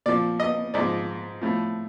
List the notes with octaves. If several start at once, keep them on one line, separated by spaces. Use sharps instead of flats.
A#2 F3 D5
D#5
G#2 F3 D5
A2 F3